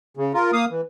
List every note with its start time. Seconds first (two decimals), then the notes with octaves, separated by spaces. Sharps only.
0.17 C#3
0.34 F4 A#4
0.53 A#3 F5 D#6
0.70 E3